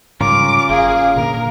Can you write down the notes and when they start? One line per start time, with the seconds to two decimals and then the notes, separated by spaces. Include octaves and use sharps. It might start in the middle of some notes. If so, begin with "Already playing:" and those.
0.21 G#2 C#3 G3 C#4 F4 A#4 D6
0.69 F#1 G#4 F5
1.16 A#2 D3 A#3 A#4